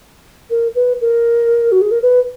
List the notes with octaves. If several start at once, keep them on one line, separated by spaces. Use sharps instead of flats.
A#4
B4
A#4
F#4
G#4
A#4
B4